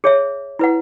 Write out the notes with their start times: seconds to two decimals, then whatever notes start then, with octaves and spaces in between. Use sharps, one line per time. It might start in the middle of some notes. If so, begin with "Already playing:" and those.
0.04 G#4 C#5 E5
0.59 E4 B4 F#5